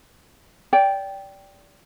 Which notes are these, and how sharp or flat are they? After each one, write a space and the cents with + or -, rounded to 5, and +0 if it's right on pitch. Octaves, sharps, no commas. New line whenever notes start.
D5 -25 G5 +0